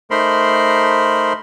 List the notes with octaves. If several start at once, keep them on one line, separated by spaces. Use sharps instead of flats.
A3 D#4 A#4 C5 B5 C6